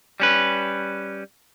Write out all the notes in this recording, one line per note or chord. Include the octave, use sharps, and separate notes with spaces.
G3 C#4 B4